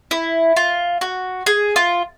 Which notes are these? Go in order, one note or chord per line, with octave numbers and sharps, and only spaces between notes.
E4
F4
F#4
G#4
F4